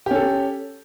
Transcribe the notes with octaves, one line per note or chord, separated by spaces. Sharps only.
C#4 G4 A4